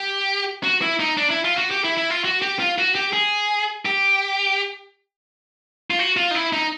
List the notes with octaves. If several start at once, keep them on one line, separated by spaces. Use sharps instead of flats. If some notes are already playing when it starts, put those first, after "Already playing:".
Already playing: G4
F#4
E4
D#4
D4
E4
F4
F#4
G4
E4
E4
F4
F#4
G4
F4
F#4
G4
G#4
G4
F4
F#4
F4
D#4
E4
D#4